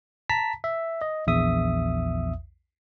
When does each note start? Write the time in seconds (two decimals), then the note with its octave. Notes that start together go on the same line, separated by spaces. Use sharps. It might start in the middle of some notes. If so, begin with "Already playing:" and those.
0.30 A5 A#5 B6
0.64 E5
1.01 D#5
1.27 A#1 E2 E5 D#6